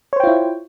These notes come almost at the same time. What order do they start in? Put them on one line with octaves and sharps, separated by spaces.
C#5 C5 G5 F4 E4